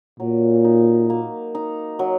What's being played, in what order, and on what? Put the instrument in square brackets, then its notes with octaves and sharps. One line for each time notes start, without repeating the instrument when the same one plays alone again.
[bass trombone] A#2 [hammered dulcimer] F#3
[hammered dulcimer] D#4
A#3
D#4
F#3